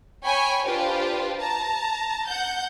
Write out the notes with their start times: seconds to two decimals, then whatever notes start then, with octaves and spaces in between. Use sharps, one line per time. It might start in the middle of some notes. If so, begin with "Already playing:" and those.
0.24 C#5 G5 G#5 B5 C#6
0.67 D4 F4 G4 B4 C5
1.39 A5 A#5
2.26 F#5 G6